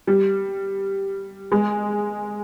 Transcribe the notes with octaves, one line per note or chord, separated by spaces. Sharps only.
G3
G#3